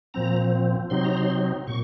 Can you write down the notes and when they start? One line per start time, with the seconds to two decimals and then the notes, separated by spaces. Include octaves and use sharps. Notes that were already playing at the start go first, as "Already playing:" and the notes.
0.14 A#2 F3 C4 A#5
0.90 C3 F#3 C4 D#4 C6
1.04 A#5
1.17 C6
1.67 A#2 C#6